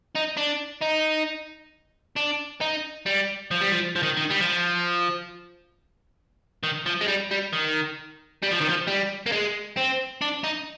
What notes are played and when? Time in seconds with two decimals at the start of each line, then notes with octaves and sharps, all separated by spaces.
0.15 D#4
0.37 D4
0.82 D#4
2.16 D4
2.61 D#4
3.06 G3
3.51 F3
3.61 G3
3.72 F3
3.96 F3
4.03 D#3
4.17 D#3
4.30 G3
4.40 F3
6.63 D#3
6.86 F3
7.01 G#3
7.08 G3
7.31 G3
7.53 D#3
8.42 G3
8.51 F3
8.61 D#3
8.69 F3
8.87 G3
9.26 A#3
9.32 G#3
9.77 C4
10.21 D4
10.44 D#4